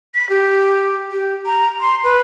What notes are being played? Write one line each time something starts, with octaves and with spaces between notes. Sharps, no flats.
B6
G4
G4
A#5
C6
B4